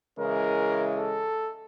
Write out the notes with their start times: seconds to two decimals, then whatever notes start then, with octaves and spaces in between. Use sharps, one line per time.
0.19 C#3 E3 G#3 A#4
0.97 A4